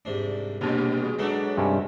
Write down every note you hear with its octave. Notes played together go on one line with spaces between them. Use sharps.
C2 G#2 D4
D#2 A#2 G3 G#3 B3 D4
F#4 G#4
F#3 G#3 B3 D4 A4
G2 C3 C#4